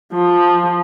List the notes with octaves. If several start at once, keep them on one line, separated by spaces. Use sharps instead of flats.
F3